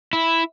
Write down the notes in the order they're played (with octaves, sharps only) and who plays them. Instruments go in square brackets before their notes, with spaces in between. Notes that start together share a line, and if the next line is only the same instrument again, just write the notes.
[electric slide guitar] E4